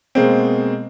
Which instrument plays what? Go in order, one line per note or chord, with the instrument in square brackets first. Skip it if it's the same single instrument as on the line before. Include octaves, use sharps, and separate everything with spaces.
[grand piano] B2 G#3 A#3 C4